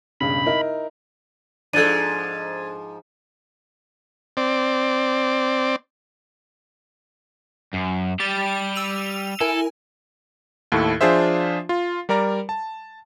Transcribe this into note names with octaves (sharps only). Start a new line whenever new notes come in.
E1 G2 C#3 B5
D#4 E4 A#4
G#2 F3 D4 A4 G#6 A6 D#7
C4 D5
F#2
G3 G4 A6
E6 D#7 F7
E4 A4 A#4 G#5
D#2 A2 E4 A4
F3 D4 F4 G#4 C5 E5
F4
G3 A#4 D5 A#5
A5